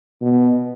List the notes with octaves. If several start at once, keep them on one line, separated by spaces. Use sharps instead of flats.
B2